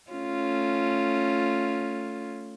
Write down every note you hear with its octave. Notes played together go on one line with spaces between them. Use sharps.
A3 C#4 F4